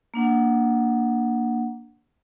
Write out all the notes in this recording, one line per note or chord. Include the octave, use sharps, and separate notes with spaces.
A#3 D4 F#5